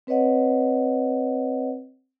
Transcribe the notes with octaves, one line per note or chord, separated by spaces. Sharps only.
C4 B4 C#5 D#5 F#5